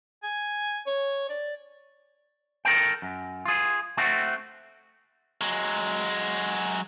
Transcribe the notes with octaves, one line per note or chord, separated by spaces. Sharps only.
G#5
C#5
D5
A4 A#4 C5 G5
F#2
F4 G#4
A3 C4 F#4
F#3 G#3